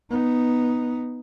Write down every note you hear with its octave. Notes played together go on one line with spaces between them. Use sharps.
B3 D#4